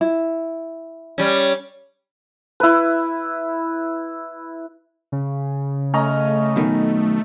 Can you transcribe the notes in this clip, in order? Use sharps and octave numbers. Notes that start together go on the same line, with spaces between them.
E4
G3 C#4
E4 B4
C#3
A3 C#4 D#5 A#5
F#2 B2 D#3